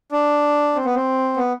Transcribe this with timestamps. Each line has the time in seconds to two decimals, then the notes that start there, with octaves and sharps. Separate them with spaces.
0.12 D4
0.75 C4
0.85 B3
0.95 C4
1.37 B3